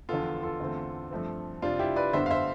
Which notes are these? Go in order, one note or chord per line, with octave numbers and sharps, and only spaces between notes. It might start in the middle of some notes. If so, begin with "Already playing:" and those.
E2 D3 F3 B3 F4 A4
F4 A4
E2 D3 A3 C4
G2 F3 A3 C4
C3 G3 C4 D4 F4
E4 G4
B4 D5
G2 D3 G3 B3 C5 E5
F5
C5 E5